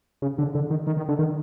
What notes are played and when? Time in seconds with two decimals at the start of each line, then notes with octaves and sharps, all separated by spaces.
0.22 C#3
0.38 D3
0.55 D3
0.70 D#3
0.87 D#3
0.97 D#3
1.09 D3
1.19 D#3